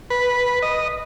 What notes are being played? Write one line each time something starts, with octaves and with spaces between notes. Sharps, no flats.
B4
D#5